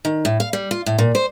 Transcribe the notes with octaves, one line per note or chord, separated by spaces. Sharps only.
D#3
A2
F5
G3
F4
A2
A#2
C5